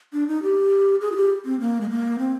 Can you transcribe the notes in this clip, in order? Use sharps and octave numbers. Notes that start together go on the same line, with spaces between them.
D4
D#4
G4
G#4
F4
G4
C4
A#3
G#3
A#3
C4